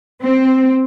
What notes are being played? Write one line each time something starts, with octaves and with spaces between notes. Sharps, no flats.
C4